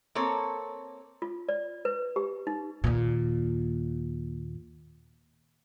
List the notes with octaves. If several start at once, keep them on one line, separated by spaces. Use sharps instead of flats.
A#3 C4 A4 C#5
F4
D5
B4
G4
D#4
D#2 A#2